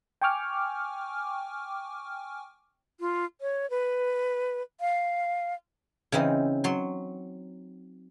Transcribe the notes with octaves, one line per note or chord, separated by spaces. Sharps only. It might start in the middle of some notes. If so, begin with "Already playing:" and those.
G5 G#5 C#6 D6 F6
F4
C#5
B4
F5
C#3 E3 C4 D#4
F#3 C6